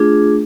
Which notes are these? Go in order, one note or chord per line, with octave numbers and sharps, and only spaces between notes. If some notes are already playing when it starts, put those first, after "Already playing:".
Already playing: A3 D4 F4 G#4